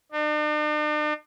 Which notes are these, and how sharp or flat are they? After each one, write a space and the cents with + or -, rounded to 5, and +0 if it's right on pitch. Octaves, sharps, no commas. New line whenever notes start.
D4 +45